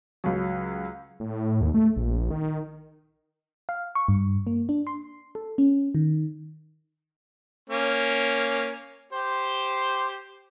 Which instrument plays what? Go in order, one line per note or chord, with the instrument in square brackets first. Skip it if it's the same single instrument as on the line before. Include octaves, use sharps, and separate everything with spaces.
[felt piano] C#2 F#3
[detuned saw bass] A2
D#2
A3
A#1
D#3
[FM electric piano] F5
C#6
G2
A#3
D4
C6
A4
C#4
D#3
[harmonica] A#3 C#4
G4 C5